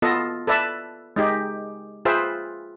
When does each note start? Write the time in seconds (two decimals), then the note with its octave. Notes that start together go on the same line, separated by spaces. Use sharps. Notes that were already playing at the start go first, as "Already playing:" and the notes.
0.02 B3 F4 A4 D#5
0.47 A4 B4 D5 E5 A5
1.16 G#3 D#4 G4
2.05 F4 G#4 B4 C5 E5 G5